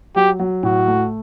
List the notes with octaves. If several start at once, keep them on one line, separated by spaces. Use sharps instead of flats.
F#3 G4
F#3
A2 F#4
A3